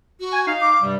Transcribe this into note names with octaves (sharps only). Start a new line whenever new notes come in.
F#4
G#5
D#4 F5
D6
G2 C3 G3